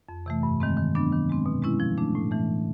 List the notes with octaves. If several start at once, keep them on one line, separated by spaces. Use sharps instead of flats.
F2
C3 E3 A3
G2
D#3 G#3 C4
D#3
F#3 B3 D4
D#3
G#3 C4
B2
G#3 C#4 E4
F3
A3 D4
A2
E3 A3